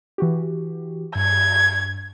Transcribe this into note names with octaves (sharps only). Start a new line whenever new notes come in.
E3 F#4 G4
G2 G#6